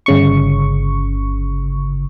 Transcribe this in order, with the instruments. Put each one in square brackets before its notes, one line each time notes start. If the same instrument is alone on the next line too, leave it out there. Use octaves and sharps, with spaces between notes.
[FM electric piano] G1 C#3 C#6